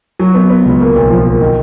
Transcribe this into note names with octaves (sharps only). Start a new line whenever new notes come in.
F#3
B3
B3
C#2
A#3
B1
F3
A#3
D#3